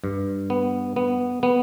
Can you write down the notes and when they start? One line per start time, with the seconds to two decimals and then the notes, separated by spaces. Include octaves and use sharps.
0.04 G2
0.50 B3
0.96 B3
1.43 B3